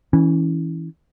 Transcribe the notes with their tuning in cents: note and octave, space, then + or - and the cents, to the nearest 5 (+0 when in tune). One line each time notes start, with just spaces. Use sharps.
E3 -20 C#4 +5